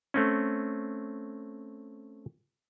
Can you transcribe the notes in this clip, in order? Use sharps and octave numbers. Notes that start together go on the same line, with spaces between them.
A3 C4 C#4